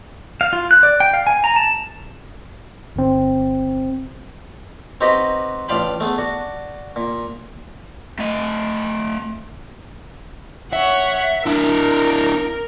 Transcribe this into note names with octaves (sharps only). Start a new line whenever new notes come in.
F5
F4
F#6
D5
G5
F5
G#5
A#5
A5
G1 C4
C4 D#4 F#4 G4 B4 D#5
A1 D4 F4 F5 G5 B5
A3 B3 G#4
D4 F#4
A#2
A3 D#5
C#5 E5 F#5
D4 E4 A#4